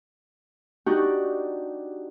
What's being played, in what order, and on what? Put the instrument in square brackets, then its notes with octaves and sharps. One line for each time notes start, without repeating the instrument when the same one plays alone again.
[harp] D4 D#4 F#4 G4